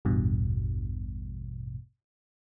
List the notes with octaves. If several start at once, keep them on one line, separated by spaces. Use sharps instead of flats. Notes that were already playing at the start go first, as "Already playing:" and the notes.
A1 E2 G2 B2